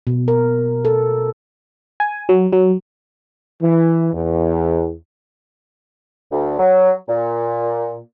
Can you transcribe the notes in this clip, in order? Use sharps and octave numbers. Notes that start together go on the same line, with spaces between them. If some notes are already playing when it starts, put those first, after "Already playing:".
B2
A#4
A4
G#5
F#3
F#3
E3
E2
D2
F#3
A#2